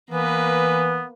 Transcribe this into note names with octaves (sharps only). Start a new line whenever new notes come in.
E3 A#3 B3 B4